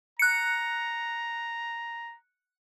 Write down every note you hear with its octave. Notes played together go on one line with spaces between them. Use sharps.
A#5 F#6 C#7